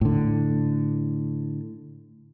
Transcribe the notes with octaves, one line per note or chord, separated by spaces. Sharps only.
A2 D3